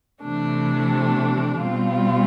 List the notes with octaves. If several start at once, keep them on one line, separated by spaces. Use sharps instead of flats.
C3 E3 A3 D4
B2 G3 C4 F4